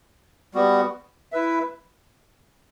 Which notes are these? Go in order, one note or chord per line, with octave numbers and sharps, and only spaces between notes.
G3 B3 F#4
E4 B4 E5